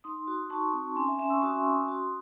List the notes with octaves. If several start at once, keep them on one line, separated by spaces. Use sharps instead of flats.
D#4 C6 D#6
F#4
D#4 A5 C#6
C4
C#4 G#5 C6
E5 G#5
C#4 E5 G#5
C#6 E6
F#4 C6 D#6
C#4
F#4